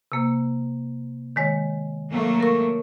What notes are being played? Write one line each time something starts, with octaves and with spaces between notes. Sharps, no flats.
C3 A#3
D#3 G#3 C#5
F#3 A3 A#3
A#4 C#6